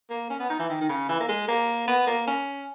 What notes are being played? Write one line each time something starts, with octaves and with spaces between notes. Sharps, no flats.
A#3
C#4
B3
D#4
E3
D#3
D#3
C#3
E3
A#3
G#3
A#3
B3
A#3
C#4